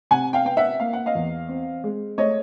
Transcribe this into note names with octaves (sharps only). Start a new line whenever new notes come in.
C3 F#5 G#5
F5 G5
B3 G5
E5 F#5
A#3 F5
F#5
D#5 F5
E2
C4
G#3
A3 C#5 D#5